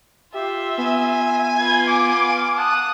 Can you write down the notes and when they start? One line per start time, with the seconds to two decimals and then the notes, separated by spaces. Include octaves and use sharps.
0.34 F4 G4 E5
0.78 B3 G#5
1.57 F4 B4 G#6
1.88 D6
2.28 F5
2.58 F#5 A5 D#6 F#6